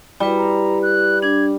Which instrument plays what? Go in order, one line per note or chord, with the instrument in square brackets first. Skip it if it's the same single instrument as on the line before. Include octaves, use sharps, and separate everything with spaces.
[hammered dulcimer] G3 [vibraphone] E4 B4
[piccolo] A#5
F#6
[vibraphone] D4 D6 [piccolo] G#6